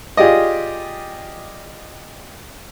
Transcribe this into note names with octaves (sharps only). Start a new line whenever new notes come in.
F4 G4 G#4 D5 D#5